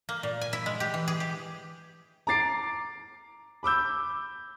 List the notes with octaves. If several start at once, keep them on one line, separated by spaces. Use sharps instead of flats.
A#3
A#2
G#5
E4
G#3
G4
E3
G#4
G4
A#5 D6 A6 C7 D7
B5 D6 E6 G6